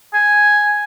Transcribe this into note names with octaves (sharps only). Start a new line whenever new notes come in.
G#5